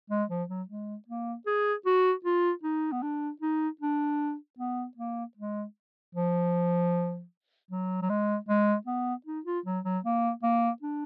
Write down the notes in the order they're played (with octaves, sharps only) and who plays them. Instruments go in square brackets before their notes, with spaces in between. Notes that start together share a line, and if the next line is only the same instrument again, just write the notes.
[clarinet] G#3
F3
F#3
G#3
A#3
G#4
F#4
F4
D#4
B3
D4
D#4
D4
B3
A#3
G#3
F3
F#3
F#3
G#3
G#3
B3
D#4
F4
F#3
F#3
A#3
A#3
D4